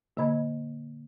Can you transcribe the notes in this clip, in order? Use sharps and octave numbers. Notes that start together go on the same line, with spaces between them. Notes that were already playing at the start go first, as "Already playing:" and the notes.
A#2 D3 A#3 D#5 B5 G#6